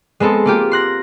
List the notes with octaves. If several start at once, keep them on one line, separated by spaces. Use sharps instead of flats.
G#3 B3 C4 A4
A#3 F4 G4
C6 F#6 A#6